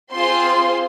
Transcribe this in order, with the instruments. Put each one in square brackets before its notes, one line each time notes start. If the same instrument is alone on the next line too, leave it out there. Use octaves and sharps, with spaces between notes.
[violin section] C4 F4 G#4 C5 C6